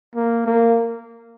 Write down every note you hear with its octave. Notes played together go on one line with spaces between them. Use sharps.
A#3
A#3